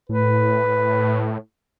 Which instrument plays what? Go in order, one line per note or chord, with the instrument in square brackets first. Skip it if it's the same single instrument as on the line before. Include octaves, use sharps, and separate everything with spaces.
[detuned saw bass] A2 [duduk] B4